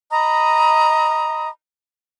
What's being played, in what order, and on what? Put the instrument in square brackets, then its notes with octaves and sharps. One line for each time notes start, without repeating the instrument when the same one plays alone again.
[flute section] D#5 A#5 B5 D#6